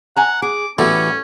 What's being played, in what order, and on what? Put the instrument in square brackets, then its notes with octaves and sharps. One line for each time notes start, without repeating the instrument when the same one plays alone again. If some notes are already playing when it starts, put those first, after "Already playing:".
[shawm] F#5 [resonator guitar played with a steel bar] G#5 A#5
[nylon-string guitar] G#4 [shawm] D6
[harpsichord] A2 G3 A3 [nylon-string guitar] E3 B3 F#4 [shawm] C#4